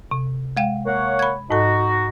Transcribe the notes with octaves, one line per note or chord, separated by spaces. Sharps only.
C3
G#3 F5 G5
A#3 C#5 F#5
B5 G#6
G#2 D#4 F#4 A4